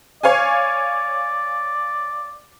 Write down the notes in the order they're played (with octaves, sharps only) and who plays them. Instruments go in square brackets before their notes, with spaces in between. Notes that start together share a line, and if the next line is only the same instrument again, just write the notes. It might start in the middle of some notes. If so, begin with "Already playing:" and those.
[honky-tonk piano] C#5 F5 G#5 [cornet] D5